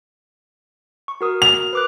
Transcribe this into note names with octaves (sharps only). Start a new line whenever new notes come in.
C#6
F#4 A#4 D#6
F7
B4 D6 F#6